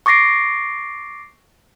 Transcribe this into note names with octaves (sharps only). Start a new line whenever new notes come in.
C#6 D6 A6 A#6 C7 D7